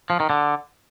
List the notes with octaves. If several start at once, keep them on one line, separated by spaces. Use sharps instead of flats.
F3
D#3
D3